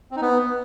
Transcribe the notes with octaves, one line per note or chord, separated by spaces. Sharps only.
C4
D#4
B3